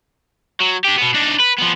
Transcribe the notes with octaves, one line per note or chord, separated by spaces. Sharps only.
F#3
D4 G4
B2 B3
D4 D#4
B4
F3 B3